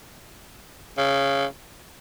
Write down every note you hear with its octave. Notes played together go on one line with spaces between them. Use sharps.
C#3